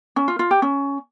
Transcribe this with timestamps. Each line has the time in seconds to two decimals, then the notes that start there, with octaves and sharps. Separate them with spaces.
0.16 C#4
0.28 F4
0.39 F4
0.51 G4
0.62 C#4